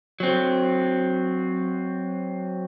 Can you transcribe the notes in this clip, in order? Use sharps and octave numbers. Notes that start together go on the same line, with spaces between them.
F#3 C4